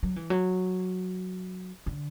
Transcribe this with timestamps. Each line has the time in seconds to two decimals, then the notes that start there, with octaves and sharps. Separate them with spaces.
0.03 F#3
0.16 E3
0.30 F#3
1.86 D3